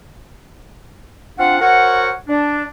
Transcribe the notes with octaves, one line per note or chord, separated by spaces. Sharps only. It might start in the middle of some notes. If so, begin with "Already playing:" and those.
C4 D4 F4 F5 F#5
F#4 A#4 C5 C#5 F#5
D4